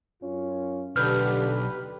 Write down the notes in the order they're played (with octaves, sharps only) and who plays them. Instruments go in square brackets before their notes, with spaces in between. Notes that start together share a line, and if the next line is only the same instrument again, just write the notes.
[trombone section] F#2 C#4 F4
[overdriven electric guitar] B1 [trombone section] D3 [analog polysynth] G4 B4 [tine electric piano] F6 G6